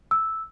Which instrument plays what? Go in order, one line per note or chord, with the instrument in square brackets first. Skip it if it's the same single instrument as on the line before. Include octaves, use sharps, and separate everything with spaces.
[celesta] E6